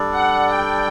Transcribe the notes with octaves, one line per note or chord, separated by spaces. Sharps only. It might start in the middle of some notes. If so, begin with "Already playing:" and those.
Already playing: G3 D4 A4 D5
F#5
G5